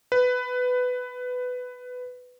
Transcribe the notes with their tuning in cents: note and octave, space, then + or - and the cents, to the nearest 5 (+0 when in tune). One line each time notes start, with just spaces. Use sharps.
B4 +15